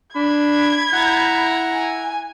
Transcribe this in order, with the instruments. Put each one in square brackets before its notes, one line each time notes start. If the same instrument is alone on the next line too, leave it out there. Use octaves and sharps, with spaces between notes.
[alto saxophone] D4 [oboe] B5 [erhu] G#6
[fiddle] E4 A#5 [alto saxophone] F#5
[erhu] G#5